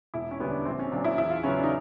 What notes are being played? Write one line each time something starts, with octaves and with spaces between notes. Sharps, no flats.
E1 E4
C#4
D2 D3 G3 B3
D4
A#1 C4
C#4
A#2 F#3 D4
E4
E2 E4
F4
C#3 F#3 B3 C#4
D4
D#4